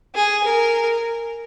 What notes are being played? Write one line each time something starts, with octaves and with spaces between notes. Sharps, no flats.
G#4
A#4